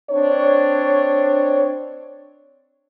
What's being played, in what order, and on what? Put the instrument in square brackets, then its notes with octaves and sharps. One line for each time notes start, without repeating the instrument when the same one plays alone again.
[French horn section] C4 D4 C#5